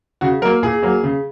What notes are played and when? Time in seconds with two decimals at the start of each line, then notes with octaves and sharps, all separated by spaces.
0.21 C#3 F#4
0.42 F#3 A#4
0.45 A#3
0.63 A#2 G#4
0.83 F#3 A#3
1.03 C#3